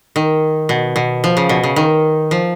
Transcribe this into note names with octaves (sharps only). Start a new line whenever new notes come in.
D#3
B2
B2
F3
C#3
B2
C#3
D#3
F3